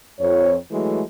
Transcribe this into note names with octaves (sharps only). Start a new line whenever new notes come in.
F2 C#5
E3 F#3 G#3 A3